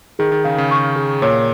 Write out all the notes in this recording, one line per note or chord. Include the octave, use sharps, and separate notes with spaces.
D#3 G#4
D#3
C#3 F5
C#3
C#6
G#4
A#2 C#5